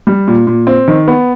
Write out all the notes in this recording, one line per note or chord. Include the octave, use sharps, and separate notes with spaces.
G3
A#2
A#2
C4
D#3
B3